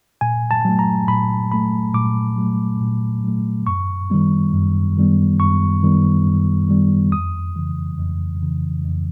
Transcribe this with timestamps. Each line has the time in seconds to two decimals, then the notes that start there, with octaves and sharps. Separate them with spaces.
0.21 A#2 G#5
0.51 A5
0.65 F#3 A3
0.79 A#5
1.08 A#2 B5
1.52 F#3 A3 B5
1.94 A#2 D6
2.38 F#3 A3
2.81 A#2
3.24 F#3 A3
3.67 F#2 C#6
4.10 D#3 G3 B3
4.53 F#2
4.97 D#3 G3 B3
5.40 F#2 C#6
5.83 D#3 G3 B3
6.26 F#2
6.69 D#3 G3 B3
7.12 F2 D#6
7.56 C#3 E3
8.00 F2
8.43 C#3 E3
8.85 F2